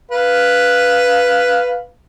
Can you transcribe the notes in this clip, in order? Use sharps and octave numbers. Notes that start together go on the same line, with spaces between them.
B4 F5